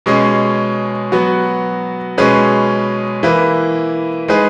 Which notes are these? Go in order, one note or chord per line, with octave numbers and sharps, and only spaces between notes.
B2 G#3 C#4 G#4
F#3 B3 F#4
B2 G#3 C#4 G#4 B4
E3 A#3 E4 B4
G#3 D#4 G#4 B4